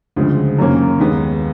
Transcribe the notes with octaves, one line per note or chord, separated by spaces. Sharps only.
D2 C#3 F3 G#3 C4
F#2 D#3 F#3 A#3 C#4
D#2 D#3 G#3 B3